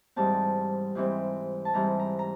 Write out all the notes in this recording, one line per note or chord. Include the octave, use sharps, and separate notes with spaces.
G#2 E3 G3 C4 A5
G#2 E3 G3 C4
A5
G#2 E3 G3 C4 A#5
A#5
A#5